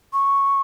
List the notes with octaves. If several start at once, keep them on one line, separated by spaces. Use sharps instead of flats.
C#6